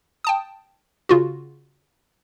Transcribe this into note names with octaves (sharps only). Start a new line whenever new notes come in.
G5 A5 D#6
C#3 F4 F#4